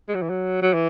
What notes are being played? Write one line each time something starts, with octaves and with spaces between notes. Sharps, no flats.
G#3
F#3
E3
F#3
F#3
E3